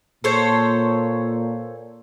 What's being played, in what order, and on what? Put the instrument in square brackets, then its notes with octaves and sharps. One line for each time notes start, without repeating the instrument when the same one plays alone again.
[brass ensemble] A#2 [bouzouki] A4 C5 C#5